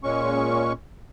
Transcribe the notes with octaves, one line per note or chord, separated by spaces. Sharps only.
A#2 G#3 C#4 C#6